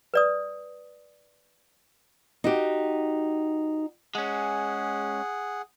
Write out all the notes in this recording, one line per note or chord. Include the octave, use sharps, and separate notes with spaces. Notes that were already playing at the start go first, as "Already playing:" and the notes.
B4 D5 D#6
D#4 F#4 G4
G#3 C#4 G#4 F#5